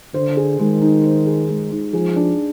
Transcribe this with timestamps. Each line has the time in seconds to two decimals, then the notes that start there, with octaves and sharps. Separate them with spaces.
0.14 D3 C5
0.37 G#4
0.59 D#3 G#3
0.82 D#4
1.04 C5
1.26 G#4
1.49 G#3
1.71 D#4
1.93 F3 G#4
2.16 D4